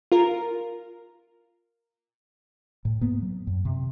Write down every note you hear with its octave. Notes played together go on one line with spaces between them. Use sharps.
F4 A#4
A2
G#2 A#3 B3
F#3
F#2
C3